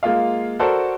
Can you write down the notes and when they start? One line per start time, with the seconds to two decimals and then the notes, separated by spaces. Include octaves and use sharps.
0.03 G#3 A#3 F4 F5
0.59 F#4 A4 A#4 C5 D5